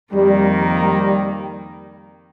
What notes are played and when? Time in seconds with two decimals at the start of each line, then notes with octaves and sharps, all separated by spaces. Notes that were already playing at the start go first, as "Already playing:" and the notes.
0.13 F2 D#3 G3 A#3
0.82 G3